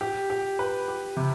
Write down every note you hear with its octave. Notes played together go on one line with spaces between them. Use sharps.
G4
G4
B4
G4
C3